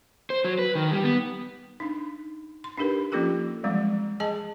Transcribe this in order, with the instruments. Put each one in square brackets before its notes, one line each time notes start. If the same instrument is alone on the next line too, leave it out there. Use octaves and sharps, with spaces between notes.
[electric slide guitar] C5
F#3
B4
D#3
G3
B3
[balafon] D4 D#4
C6
D4 D#4 G4 A#4 B4
F3 A#3 C#4 F4 G4 A4
E3 F3 G3 G#3 C4
G#4 D#5 G#5 A5